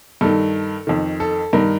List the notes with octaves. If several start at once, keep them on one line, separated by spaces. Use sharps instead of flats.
G2 D#3 A4
F2 D#3
A4
G2 D#3 A#4